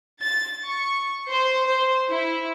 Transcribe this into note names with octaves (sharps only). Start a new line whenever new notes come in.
A6
C#6
C5
C5
E4